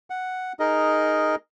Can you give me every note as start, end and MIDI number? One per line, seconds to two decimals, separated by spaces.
0.10 0.53 78
0.60 1.35 63
0.60 1.35 68
0.60 1.35 70
0.60 1.35 75